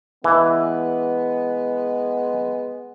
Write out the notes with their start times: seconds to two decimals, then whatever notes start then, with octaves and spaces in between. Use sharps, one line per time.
0.24 E3 G#3 B3